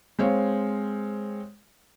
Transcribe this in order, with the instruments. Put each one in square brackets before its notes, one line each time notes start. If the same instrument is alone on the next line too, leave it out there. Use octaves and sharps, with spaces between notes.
[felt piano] G#3 C4 C#5 F5